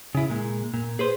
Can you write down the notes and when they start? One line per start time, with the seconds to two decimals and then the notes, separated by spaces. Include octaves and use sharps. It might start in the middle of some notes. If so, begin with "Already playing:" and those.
0.15 C#3 E4
0.30 A#2 G#3
0.74 A#2
0.99 G#4 B4 C5